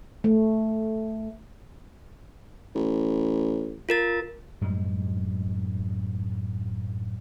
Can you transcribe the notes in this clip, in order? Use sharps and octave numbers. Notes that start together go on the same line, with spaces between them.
A3
A1
F4 A#4 A6
F#2 A2 G3 G#3